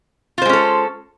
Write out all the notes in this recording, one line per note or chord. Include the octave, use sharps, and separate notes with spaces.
G#3 C#4 F4 A4 C5